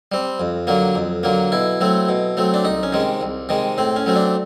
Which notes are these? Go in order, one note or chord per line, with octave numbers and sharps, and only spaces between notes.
G3 C4
F2
D3 F#3 A#3
F2
D3 F#3 A#3
B2 E4
F#3 A3 C4
B2
F#3 A3 C4
D4
C2 D#4
C#4
C3 D#3 G#3
C2
C3 D#3 G#3
A2 C4
C#4
F#3 A3 C4
D4